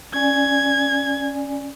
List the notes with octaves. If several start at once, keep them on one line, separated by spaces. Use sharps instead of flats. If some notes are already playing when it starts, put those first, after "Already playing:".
C#4 D5 G#5 G#6